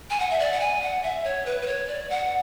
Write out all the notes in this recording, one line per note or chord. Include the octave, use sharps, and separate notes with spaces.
G#5
F#5
E5
D5
F#5
G#5
F#5
E5
C#5
B4
B4
C#5
D5
F#5